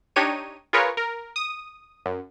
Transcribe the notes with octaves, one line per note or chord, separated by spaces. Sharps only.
D4 D#4 G4 C#5 D#7
F4 G#4 A#4 B4 C#5
A#4
D#6
F#2